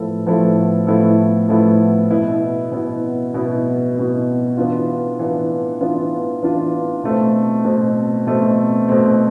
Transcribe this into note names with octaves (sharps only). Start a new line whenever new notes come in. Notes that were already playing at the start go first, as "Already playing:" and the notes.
Already playing: A2 F3 B3 E4 A4
A2 F3 B3 E4 A4
A2 F3 B3 E4 A4
A2 F3 B3 E4 A4
B2 B3 E4
B2 B3 E4
B2 B3 E4
B2 B3 E4
E3 B3 D4 F4
E3 B3 D4 F4
E3 B3 D4 F4
E3 B3 D4 F4
B2 A3 C4
B2 A3 C4
B2 A3 C4
B2 A3 C4